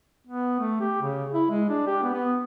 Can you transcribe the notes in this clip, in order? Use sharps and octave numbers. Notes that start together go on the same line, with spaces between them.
B3
A3
G4
C#3
E4
G#3
D4
G4
B3
B3